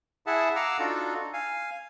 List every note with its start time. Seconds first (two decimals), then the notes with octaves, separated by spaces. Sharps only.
0.27 E4 G#4 E5 F#5 A5
0.56 F5 F#5 A#5 D6 E6 F6
0.79 D4 D#4 F4 F#4 A4
1.33 F5 G#5